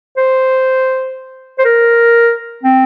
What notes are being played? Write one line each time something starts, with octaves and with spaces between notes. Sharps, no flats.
C5
C5
A#4
C4